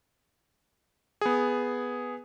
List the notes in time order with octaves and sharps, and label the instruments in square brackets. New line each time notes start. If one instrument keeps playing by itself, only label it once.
[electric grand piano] B3 G#4